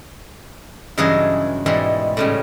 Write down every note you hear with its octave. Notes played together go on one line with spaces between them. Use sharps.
G2 C#3 E3 F#3 G#4 D#5
G#2 B2 E3 G3 G#3
A2 C#3 G3